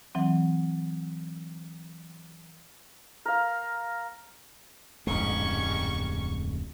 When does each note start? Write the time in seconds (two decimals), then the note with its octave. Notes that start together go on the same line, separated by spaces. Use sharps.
0.15 E3 F#3 C4
3.26 A#4 F5
5.07 D1 F2 G#2 G3 G#3 C#4 C#6